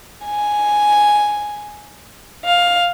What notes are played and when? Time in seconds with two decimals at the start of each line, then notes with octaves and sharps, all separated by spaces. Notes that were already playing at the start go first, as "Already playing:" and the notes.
0.25 G#5
2.45 F5